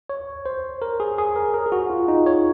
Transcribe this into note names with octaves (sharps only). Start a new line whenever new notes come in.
C#5
C5
A#4
G#4
G#4
A#4
A#4
G#4
F#4
F4
D#4
C#5